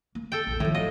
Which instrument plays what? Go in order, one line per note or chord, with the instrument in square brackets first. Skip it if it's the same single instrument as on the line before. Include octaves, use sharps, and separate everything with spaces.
[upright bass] A#3
[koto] A4 G5
[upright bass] A#1 E2
[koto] A2 [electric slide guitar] D#3 [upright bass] F3 G3
[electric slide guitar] F#3 F5 [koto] D#5